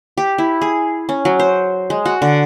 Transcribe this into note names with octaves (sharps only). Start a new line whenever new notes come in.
G4
E4
G#4
C#4
F#3
C5
G#3
F#4
D3